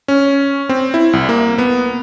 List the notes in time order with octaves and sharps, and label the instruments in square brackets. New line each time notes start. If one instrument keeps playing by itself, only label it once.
[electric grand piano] C#4
C4
E4
C2
A#3
B3